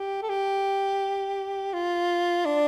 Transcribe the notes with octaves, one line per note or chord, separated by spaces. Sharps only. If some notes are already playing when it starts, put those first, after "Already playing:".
Already playing: G4
A4
G4
F4
D4